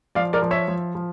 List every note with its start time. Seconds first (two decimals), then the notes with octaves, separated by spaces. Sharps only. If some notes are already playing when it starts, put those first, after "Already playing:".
0.15 F3 D5 F5
0.33 A#4 D5
0.42 F3
0.51 C#5 E5
0.68 F3
0.95 F3